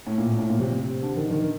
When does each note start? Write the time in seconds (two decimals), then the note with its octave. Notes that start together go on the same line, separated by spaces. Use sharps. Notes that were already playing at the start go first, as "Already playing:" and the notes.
0.07 A2
0.18 A#2
0.29 A2
0.39 A2
0.49 A#2
0.60 C3
1.02 D3
1.16 D#3
1.26 D3
1.31 D#3